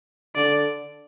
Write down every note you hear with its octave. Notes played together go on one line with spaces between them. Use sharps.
D3 D5